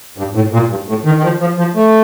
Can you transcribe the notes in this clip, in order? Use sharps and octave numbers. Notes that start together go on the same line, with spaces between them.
G2
A2
A#2
G2
A2
D#3
D#3
F3
F3
F3
A3